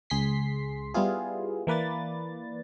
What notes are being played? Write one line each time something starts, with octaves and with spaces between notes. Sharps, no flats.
C#2 G#4 C6 B6 C7
G3 B3 E4 F4 G#4
E3 A#3 B4 D5 A6